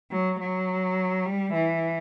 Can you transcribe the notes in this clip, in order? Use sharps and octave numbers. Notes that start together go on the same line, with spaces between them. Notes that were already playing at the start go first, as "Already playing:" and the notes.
F#3
F#3
G3
E3